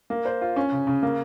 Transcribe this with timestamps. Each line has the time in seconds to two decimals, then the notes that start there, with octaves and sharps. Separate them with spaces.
0.10 A#3
0.25 C5
0.41 F4
0.56 C#4
0.72 C#3
0.87 C#3
1.03 A#3